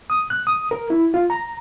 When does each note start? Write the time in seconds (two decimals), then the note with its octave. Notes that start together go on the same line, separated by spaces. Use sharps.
0.10 D#6
0.30 F#6
0.47 D#6
0.71 A#4
0.90 E4
1.14 F4
1.30 A#5